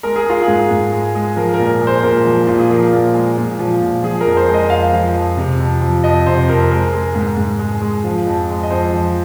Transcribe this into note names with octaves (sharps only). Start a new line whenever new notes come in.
G#3 A#4
G#4
G#3 F4
G#2 G#4
G#2
G#3
G#3
F3 A#4
A#4
A#2
G#3
C5
A#2 A#4
F3
A#2 F4
G#4
F3 A#4
A#2
G#3
A#2
F3
A#2
F3 G#4
A#4
F2
C5
G#3
D#5
F2 F5
F3
F2
C3
F2
F3
F2 D#5
C3 C5
F2 A#4
G#3 A#4
G#3
G#2
G#2
G#3
G#3
F3
F2
G#3
D#5
F2 C5
F3